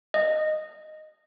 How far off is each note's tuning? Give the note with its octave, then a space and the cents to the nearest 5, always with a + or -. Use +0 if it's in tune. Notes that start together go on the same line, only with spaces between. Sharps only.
D#5 -10